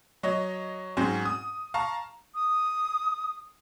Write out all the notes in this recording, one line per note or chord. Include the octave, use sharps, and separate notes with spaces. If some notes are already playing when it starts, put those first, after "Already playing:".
F#3 C#5 D#5
G#2 F#3 C4 C#4
D#6
F5 A5 A#5 C#6
D#6